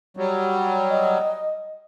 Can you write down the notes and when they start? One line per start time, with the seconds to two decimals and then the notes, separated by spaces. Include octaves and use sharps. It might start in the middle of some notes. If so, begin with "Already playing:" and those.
0.17 F#3 G3
0.90 D#5